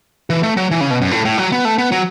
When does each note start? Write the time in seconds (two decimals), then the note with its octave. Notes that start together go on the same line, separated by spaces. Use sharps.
0.30 E3
0.43 A3
0.57 F#3
0.71 E3
0.81 C#3
0.91 B2
1.01 F#2
1.11 A2
1.25 A2
1.38 F#3
1.52 B3
1.65 A3
1.78 B3
1.92 F#3